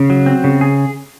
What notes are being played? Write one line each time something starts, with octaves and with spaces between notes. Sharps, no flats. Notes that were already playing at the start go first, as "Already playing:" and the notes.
Already playing: C#3
F#3
C4
C#3
G#4